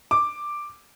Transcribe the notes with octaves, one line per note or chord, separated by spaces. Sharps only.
D6